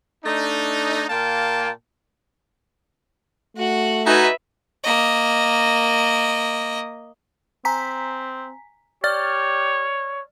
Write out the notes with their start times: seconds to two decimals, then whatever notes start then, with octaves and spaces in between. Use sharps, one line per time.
0.25 A3 D4 D#4
1.10 A#2 A#3 F5 G5 A5
3.57 A3 F#4 F#5
4.07 D#4 F#4 B4 E5 G#5
4.84 A#3 D#5
7.65 C4 G#5 A#5 B6
9.04 G4 C#5 D5 F6 A6